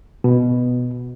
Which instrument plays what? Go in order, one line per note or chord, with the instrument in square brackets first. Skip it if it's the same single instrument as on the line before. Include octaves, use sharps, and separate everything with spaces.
[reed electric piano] B2